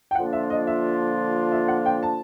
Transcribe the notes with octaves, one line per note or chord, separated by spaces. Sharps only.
G5
D3 F3 A#3 D4 F4 F#5
E5
D#5
E5
E5
F#5
G5
A5